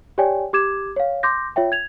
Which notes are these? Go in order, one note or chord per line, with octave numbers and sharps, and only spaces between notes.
G4 C#5 D5 G5 G#5
G4 D6 G#6 E7
C#5 F5
C6 D6 G6 A#6
F4 C#5 E5 G5
G#6 F7